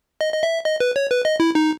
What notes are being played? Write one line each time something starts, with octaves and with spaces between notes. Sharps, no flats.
D#5
D#5
E5
D#5
B4
C#5
B4
D#5
E4
D#4